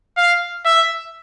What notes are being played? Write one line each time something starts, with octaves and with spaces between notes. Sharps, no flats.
F5
E5